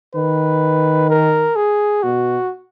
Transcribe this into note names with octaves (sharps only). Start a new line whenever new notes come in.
D#3 B4
A#4
G#4
B2 F#4